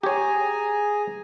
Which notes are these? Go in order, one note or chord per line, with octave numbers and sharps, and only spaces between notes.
G4 G#4 C#5 G#5 A#5